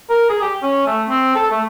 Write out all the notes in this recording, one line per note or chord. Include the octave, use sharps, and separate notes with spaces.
A#4
G#4
G4
C#4
A3
C4
A4
A3